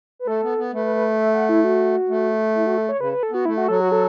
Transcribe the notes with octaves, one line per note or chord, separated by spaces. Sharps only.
B4
A3 A4
B3
B3
A3 B4
B4
B4
E5
F#5
E4
F#4
A3
E4
F#4
A4
C#5
C#3 B4
B4
A4
B3 F#4
A3 E4
F#4
F#3 A4
F#4
A4